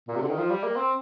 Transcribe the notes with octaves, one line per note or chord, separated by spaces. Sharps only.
A#2
C3
D3
D#3
F3
G3
A#3
C4